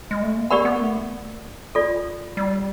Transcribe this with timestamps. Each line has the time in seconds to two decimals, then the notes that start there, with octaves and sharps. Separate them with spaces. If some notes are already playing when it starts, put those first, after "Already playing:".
0.11 G#3
0.23 A3
0.37 A#3
0.50 B3 G4 A#4 D5 F#5 B5
0.65 B3
0.81 A3
1.75 F4 A4 D5
2.37 G3